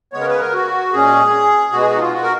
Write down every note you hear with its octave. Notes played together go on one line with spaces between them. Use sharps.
C#3 G#3 B3 C#5
A#4
B4
A#4
F#4
A#2 G#3 C#4 G#4
B2 G#3 B3 F#4
G#4
F#4
D#4
F4
F#4
A#4